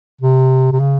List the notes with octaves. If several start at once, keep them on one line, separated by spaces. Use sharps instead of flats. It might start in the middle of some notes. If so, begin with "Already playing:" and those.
C3
C3
C#3